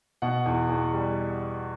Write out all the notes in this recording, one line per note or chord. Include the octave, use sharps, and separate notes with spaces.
B2 F#5
E2
E2
G3